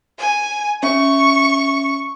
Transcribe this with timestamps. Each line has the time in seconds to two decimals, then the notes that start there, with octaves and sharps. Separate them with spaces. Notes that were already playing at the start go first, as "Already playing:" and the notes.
0.19 G#5
0.83 C#4 E5 C#6